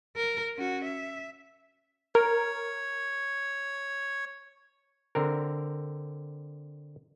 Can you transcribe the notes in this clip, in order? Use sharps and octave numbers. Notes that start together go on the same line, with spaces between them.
A#4
C#4 F#4
E5
A#4 C#5
D3 C4 A#4